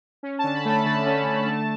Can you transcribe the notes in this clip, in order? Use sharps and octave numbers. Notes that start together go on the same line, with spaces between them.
C#4
A5
D3
B5
A3 B5
D3 A5
C#4
D3
A3